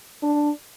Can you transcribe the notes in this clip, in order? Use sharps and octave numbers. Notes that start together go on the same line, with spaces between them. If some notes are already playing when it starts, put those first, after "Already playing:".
D4